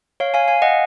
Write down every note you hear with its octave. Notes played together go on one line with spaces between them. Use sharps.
C#5 F5
F5 G#5
F5 G#5
D#5 F#5